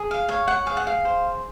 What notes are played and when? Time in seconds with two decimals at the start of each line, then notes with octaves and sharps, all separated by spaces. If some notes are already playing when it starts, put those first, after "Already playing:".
Already playing: G#4
0.11 F5
0.29 C#5 F5
0.48 F#5
0.66 G#4 F5
0.77 F#5
0.87 F5
1.05 C5